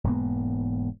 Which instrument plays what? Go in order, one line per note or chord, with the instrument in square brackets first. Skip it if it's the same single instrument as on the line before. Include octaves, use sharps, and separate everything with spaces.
[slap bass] E1 G#2 A#3 B3